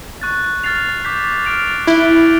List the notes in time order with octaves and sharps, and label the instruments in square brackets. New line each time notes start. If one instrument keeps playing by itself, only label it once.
[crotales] C#6 F#6 A6
F6 A6 C7 F7
D6 G6 B6
F6 A6 D7 F7
[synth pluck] E4 [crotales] F#6 B6 D7 G7